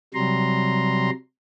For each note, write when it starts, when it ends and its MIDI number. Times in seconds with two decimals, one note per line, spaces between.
0.14 1.10 48
0.14 1.10 54
0.14 1.10 55
0.14 1.10 82
0.14 1.10 84